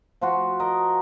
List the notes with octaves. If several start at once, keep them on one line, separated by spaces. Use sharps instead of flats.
F3 F4 F#4
A#4 D#5